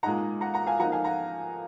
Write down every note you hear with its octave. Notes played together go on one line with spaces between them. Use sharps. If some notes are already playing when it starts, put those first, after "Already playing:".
A#2 G#3 D#4 F#5 A#5
F#5 A#5
F#5 A#5
F5 G#5
F3 A#3 D#4 F#5 A#5
F5 G#5
F#5 A#5